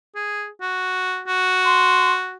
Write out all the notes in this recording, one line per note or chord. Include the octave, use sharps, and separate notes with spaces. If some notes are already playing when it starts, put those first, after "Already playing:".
G#4
F#4
F#4
C6